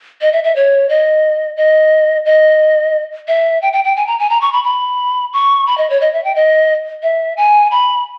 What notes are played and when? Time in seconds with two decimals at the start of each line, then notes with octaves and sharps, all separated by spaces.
0.21 D#5
0.33 E5
0.44 E5
0.56 C#5
0.89 D#5
1.57 D#5
2.26 D#5
3.28 E5
3.62 G5
3.73 G5
3.84 G5
3.96 G#5
4.07 A#5
4.19 G#5
4.30 A#5
4.41 C#6
4.53 B5
4.64 B5
5.33 C#6
5.67 B5
5.78 D#5
5.90 C#5
6.01 D#5
6.13 E5
6.24 G5
6.36 D#5
7.03 E5
7.37 G#5
7.71 B5